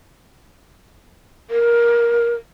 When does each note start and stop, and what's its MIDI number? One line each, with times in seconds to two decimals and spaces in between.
1.50 2.34 70